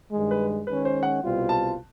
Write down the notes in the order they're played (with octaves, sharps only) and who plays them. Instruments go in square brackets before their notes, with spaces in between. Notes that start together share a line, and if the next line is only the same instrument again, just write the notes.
[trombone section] G2 D#3 G#3
[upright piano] B4
[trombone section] D#3 G#3 C#4 [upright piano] B4
[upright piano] C5
F#5
[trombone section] C2 B2 G3 C4 F4
[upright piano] A5